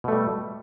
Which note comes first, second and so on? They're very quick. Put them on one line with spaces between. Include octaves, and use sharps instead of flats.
B2 A3 G3